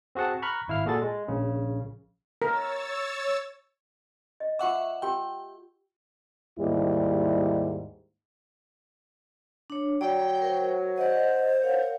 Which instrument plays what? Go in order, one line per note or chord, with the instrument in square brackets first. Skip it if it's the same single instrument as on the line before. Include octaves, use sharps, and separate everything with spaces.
[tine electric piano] C4 F#4 G#4 F#5 A5
A#5 B5 C#6 F6 F#6
G#1 E4 F5 F6
A#2 F#4 G#4 A4 A6
G#3
A#1 C#3
[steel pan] A#4 [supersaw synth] C#5 E6 A6
[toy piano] D#5
[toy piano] F4 D6 [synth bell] E5 F#5 C#6
[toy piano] F4 G4 E6 [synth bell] G5
[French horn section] D#2 G#2 G3 E4
[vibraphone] D4 C#5
[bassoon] F#3 [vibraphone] D5 A#5 [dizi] G5
[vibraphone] A#4 C5
[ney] C5 [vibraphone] D5 D#5 [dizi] F#5
[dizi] A#4 [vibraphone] C#5 F5 F#5